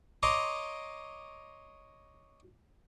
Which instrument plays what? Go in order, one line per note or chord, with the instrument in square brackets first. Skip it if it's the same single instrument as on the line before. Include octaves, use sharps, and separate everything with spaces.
[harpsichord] C#5 D#5 A#5 C6 D6